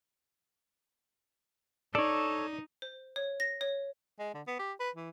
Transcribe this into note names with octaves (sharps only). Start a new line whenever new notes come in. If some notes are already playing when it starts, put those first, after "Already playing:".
D#4 A4 C#5 D5
C5
C#5
A#6
C#5
G#3
D3
B3
G4
B4
E3